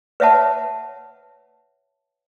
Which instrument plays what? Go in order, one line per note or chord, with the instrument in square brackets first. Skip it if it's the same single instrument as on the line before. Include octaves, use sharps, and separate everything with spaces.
[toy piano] B4 C#5 E5 F#5 A5